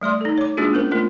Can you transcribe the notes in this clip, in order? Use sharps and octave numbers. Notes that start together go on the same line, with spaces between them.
G3 A3 D5 C6
D#4 A4
C#5 D6
G#3 A#3 D4 F4 F#4 G#4
B3 C#4 A#4 C5
A3 B3 F4 A#4